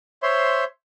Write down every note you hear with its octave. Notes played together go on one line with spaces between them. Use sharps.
C5 C#5 E5 C6